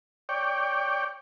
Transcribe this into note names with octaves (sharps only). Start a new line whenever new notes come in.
C#5 D5 G5